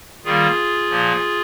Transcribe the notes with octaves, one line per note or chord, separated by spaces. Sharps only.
D#3 G3 A#3 F4 G#4
A#2 F3 A#3